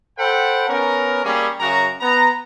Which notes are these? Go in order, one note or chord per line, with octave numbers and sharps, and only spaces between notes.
A4 C5 F#5 G5 B5
B3 C#4 A#4
G3 A#3 C#4 G#4
F#2 C#3 F#4 A#4 A#5
B3 A#5